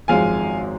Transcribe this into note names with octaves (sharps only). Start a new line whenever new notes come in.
G#1 F#2 F3 G#3 F5 G#5